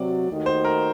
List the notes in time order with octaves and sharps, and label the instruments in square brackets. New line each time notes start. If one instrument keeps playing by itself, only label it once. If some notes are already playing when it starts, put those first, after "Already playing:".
Already playing: [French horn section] C3 F#3 C4 F#4 [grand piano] D5
[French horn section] D#2 D#3 A3 D#4 F#4
[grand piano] C5
A#4